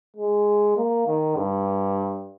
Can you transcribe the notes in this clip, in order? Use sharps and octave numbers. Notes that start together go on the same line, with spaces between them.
G#3
A#3
D#3
G2